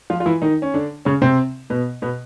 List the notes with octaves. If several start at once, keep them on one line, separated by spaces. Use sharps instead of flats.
F3 F4
F4
E3 E4
D#3 D#4
C#4
D3 D4
C#3 C#4
C3 C4
B2 B3
B2 B3